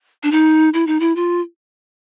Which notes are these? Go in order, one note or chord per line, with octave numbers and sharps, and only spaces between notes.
D4
D#4
E4
D#4
E4
F4